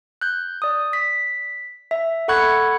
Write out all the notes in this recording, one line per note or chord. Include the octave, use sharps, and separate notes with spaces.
F#6 G6
D5 D#6
B6
E5
A4 F#5 B5 C#6 F#6 G#6